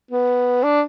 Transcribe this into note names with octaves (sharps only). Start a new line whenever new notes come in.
B3
D4